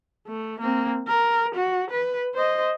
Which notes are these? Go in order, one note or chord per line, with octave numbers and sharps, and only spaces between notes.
A3
A#3 C4
A#4
F#4
B4
C5 D#5